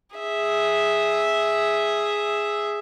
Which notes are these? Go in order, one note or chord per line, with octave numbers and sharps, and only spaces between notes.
G#4 E5